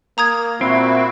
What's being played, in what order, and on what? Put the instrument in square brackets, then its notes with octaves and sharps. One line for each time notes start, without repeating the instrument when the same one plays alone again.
[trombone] A#3 [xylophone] A#5 D#6 G#6
[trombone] A#2 [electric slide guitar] C4 [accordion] E4 F#4